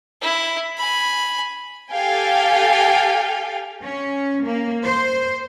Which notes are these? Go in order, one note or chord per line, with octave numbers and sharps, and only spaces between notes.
E4
G#5 B5
G4 A4 F5 G5 G#5
C#4
A#3
C5